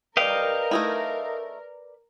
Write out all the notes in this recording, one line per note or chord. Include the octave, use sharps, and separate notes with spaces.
A#4 B4 D5 D#5 F5 G5
A3 D#4 E4